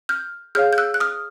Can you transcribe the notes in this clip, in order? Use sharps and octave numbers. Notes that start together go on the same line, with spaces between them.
F6 G6
G#4 C#5 F5 F6 G6
G6
E6 F#6
F#6
D#6 F6